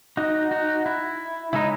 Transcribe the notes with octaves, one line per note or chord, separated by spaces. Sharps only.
D#4 F#4
D#4 F#4
E4
C#3 G#3 D#4 E4